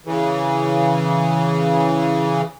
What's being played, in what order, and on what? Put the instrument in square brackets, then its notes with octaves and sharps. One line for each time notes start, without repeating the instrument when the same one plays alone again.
[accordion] C#3 E3